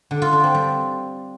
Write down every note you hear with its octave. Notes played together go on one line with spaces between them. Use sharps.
D3
F4
D4
C4
G3